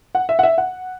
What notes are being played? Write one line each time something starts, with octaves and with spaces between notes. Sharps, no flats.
F#5
E5
F#5
E5
F#5